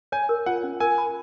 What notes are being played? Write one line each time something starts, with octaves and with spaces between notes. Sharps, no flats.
C#5 G#5
A#4
F4 F#5
C#4
A#4 G#5
B5